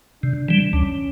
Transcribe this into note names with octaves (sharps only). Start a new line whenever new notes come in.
C3 D4
E3 G3
D2 C#4